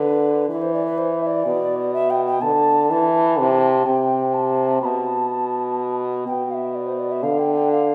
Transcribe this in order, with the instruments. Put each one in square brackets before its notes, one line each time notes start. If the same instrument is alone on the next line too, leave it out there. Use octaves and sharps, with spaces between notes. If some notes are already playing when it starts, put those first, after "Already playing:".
Already playing: [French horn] D3 [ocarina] B4
[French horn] E3 [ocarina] B4
[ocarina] C5
D5
B4
C5
E5
D5
[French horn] B2
[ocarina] E5
G5
G5
[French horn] D3 [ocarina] A5
[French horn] E3 [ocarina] A5
[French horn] C3
[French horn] C3 [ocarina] G5
[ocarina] A5
[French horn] B2 [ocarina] A5 B5
[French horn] B2 [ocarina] G5
[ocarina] F5
E5
D5
C5
D5
E5
[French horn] D3 [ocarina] F5
[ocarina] G5
G5
F5